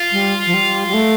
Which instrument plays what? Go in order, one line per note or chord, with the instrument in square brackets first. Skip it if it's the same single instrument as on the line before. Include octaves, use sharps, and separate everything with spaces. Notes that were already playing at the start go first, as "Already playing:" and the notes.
Already playing: [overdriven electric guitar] F4
[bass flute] G3
F3
G3
G3
A3